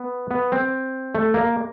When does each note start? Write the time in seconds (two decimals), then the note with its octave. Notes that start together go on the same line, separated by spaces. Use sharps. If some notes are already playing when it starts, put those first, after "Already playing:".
Already playing: B3
0.31 B3
0.52 C4
1.15 A3
1.34 A#3